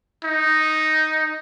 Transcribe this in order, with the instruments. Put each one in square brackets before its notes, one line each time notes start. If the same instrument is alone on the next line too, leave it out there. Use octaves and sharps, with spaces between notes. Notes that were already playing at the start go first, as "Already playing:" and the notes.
[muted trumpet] D#4